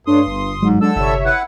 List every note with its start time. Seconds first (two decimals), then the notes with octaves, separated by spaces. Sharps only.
0.07 G2 A3 D4 C#5 C6 D#6
0.26 G1
0.62 G#2 F#3 G#3
0.81 D3 D4 A4 E6
0.96 G1 C3 C#5 E5
1.25 E4 B4 F#5